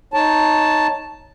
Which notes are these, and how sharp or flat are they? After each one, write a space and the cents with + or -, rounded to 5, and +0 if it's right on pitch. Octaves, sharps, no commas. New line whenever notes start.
D#4 +0 C#5 -5 A5 +0